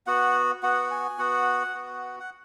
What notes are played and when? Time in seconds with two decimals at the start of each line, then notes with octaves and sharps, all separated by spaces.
0.07 B3 F#4 F#5
0.63 B3 F#4 F#5
0.91 G#5
1.18 B3 F#4 F#5
1.74 B3 F#4
2.20 F#5